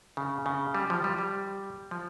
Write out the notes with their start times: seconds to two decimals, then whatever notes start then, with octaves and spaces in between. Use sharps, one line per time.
0.17 C#3
0.46 C#3
0.75 G3
0.90 F3
1.04 G3
1.18 G3
1.91 F3